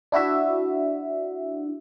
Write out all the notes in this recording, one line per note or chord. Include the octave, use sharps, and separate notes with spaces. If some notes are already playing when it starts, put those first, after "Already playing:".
D4 E4 F#4 E5